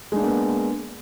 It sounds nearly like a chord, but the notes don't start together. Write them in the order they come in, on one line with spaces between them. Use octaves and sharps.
G#3 D4 A#3 B3